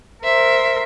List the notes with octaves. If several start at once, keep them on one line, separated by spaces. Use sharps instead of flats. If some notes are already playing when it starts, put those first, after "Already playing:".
A#4 C5 E5